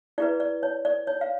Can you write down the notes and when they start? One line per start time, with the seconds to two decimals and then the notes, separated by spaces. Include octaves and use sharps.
0.18 E4 G#4 B4 D5
0.40 D5
0.63 C#5
0.85 D5
1.07 C#5
1.21 F5